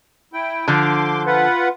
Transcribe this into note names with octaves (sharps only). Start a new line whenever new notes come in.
E4 G5
D3 F3 C6 D6
F4 B4 F#5